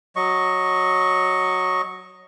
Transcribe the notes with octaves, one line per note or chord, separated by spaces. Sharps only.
F#3 D#5 C#6